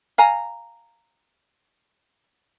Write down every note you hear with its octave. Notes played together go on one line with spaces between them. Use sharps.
F5 G#5 A#5